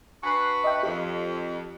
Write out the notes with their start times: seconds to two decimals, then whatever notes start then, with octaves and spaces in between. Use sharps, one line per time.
0.23 D4 F#4 B4 G#5 C7
0.64 D#5 E5 G5
0.83 F2 G4